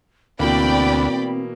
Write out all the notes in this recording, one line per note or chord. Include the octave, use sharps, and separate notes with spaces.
D2 B2 E3 A#3 C4 D5 G5 B5